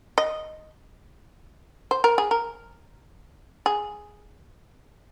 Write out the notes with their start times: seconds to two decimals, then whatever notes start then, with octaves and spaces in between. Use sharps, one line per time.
0.18 D#5
1.91 C5
2.04 A#4
2.18 G#4
2.31 A#4
3.66 G#4